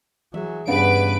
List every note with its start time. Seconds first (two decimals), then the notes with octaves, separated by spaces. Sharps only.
0.34 E3 F#3 G#4 E5
0.68 G2 C#3 B3 D4 G4 B4 D7